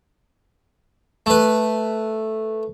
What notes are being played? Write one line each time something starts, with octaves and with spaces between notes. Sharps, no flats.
A3 B4